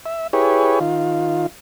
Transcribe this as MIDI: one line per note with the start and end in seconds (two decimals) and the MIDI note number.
0.06 0.27 76
0.33 0.79 64
0.33 0.79 67
0.33 0.79 68
0.33 0.79 71
0.33 0.79 73
0.80 1.46 51
0.80 1.46 65